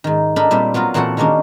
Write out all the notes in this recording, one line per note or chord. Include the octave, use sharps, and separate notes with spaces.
G#2 D#3
D4 D#4 A4 A#4 B5
A#2 G3 C4 E5
F#3 B3 F4 A#4
A#2 E3 C4 F#4 A4 F#5
D#3 G#3 A#3 C#4 D4